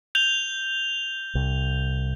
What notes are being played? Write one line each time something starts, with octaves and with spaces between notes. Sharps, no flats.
G6 F7 G7
C2